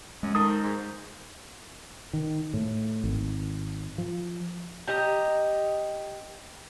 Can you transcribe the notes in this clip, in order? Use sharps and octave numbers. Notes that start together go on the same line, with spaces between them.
F#2 G#3
D#3 A4 D#6
A#4 C5
G#2
D#3
A2
G#1
F3
G4 D#5 A#5